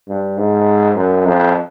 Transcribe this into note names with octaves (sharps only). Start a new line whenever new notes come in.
G2
G#2
F#2
F2